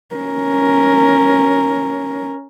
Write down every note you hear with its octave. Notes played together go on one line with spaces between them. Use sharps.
C#4 A#4